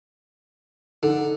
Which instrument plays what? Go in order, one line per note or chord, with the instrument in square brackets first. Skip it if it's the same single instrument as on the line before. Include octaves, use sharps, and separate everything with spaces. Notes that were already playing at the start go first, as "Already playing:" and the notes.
[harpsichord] D3 [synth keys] D#4 A4